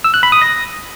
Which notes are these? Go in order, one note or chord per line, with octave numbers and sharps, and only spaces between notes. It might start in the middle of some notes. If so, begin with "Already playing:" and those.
E6
F#6
B5
D#6
A#6